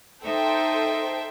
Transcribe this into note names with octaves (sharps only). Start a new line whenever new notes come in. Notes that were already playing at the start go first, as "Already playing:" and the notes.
D#4 A4 C5 E5 G5